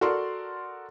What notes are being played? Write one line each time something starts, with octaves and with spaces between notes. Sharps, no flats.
F#4 A4 A#4 D5 C6